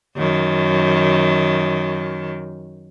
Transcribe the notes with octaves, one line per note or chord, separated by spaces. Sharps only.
F#2 D#3